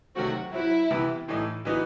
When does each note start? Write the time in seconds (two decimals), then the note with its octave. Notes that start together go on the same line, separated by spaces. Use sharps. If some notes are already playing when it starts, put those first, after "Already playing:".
0.15 C3 D#3 F#3 A3 C4 F#4
0.52 F#3 C4 E4 F#4
0.91 C3 E3 B3
1.28 A2 E3 A3 D#4
1.65 E3 B3 D#4 F#4